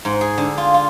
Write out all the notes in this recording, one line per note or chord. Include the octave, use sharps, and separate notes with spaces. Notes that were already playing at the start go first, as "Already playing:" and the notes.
G#2
G#4
D3
F4
F4